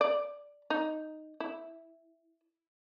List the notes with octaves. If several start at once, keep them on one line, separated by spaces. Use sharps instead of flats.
D5
D#4
E4